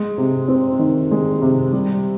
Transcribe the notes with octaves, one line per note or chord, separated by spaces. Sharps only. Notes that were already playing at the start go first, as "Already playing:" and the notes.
Already playing: G#3
C3
C4
D#3
G#3
C3
G3